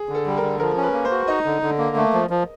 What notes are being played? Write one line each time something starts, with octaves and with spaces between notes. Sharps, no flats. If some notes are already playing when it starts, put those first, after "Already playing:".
Already playing: G#4
D3
A4
G3
A#4
D3
F3 A#4
C#4
B4
A#3
C5
F#4
D#4 D#5
D3
D3
A#3
A3
F3
F3